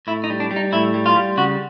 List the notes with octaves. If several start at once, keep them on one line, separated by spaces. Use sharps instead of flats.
A2 E4
D#4
G3
D4
G3
D#4
A2 E4
G3
F4
G3
C#3 F#4